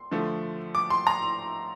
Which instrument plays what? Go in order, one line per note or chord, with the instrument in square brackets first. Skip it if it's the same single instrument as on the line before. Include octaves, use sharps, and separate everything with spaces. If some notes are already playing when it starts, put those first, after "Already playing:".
Already playing: [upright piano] C6
D3 F3 A3
D6
C6
A#5